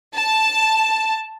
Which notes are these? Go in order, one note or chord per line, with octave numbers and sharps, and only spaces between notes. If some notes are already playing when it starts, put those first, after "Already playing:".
A5